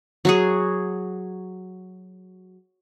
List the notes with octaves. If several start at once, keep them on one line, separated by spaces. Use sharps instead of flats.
F#3 F#4 G#4